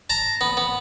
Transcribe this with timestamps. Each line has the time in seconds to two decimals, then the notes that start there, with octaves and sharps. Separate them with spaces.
0.10 A5 A#5
0.41 B3
0.57 B3